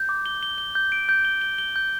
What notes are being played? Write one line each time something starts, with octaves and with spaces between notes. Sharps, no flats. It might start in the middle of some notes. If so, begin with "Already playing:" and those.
Already playing: G6
D6
G7
G7
G7
G6
D7
G6
G7
G7
G7
G6